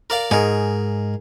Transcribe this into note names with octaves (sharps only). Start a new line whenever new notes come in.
A#4 D5 F5
G#2 G#4 A#4